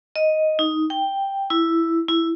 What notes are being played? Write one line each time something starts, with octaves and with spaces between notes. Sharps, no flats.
D#5
D#4
G5
E4
E4